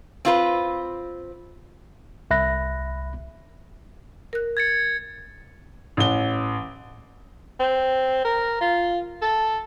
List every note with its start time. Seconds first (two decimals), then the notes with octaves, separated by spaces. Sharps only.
0.25 C4 F4 B4
2.30 C2 E5 B5 F#6 A#6
4.33 A#4 F#6
4.57 G#6 A6 C#7
5.97 A1 G7
7.60 C4
8.25 A#4
8.61 F4
9.22 A4